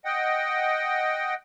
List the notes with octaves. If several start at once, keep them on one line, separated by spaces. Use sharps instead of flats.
D#5 F#5 G5